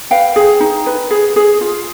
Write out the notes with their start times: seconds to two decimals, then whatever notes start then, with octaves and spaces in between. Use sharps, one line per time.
0.11 B4 F5 G5
0.36 G#4
0.60 D#4
0.86 B4
1.11 G#4
1.36 G#4
1.61 F4